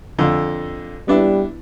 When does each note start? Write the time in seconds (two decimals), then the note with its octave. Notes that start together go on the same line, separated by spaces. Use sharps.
0.19 F2 D3
1.08 G3 B3 D4 E4